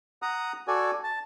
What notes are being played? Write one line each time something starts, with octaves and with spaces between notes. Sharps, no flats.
F#5 A#5 D#6
F#4 A4 D5 G#5
A5